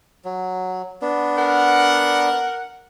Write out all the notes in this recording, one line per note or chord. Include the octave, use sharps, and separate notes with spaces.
F#3
B3 D4
A#4 F#5